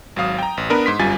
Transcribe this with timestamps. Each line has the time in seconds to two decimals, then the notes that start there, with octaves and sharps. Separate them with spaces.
0.16 G#1 F#3 F5 D#6
0.38 G5 A#5
0.57 A1
0.70 B3 D4 A#4 B4
0.86 G#2 C6 B6
0.99 G1 F#2 G3 F4 G#5 A6